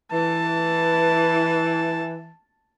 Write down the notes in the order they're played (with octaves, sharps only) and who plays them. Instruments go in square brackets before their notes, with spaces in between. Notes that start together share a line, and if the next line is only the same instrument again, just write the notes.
[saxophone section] E3 [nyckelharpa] A5